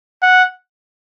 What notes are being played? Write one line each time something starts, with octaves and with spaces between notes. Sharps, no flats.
F#5